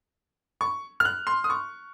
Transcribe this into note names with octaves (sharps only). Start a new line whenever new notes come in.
C#6
F6
F#6
C6
D#6
C#6